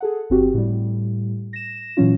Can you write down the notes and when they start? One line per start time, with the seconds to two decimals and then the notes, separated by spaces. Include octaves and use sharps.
0.01 G#4 A4 F#5
0.30 G1 C4 F#4 G4
0.54 A2 G3
1.53 A#6 E7
1.97 A#2 E3 F#3 C#4 F4